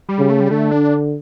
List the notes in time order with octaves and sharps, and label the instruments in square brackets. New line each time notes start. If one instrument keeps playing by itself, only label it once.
[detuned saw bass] G3
[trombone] C#3
[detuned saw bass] A3
G3
[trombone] D3 [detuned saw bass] A3
[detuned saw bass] D4